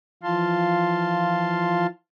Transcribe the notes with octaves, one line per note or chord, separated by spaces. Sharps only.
E3 F3 F4 F5 A5 C6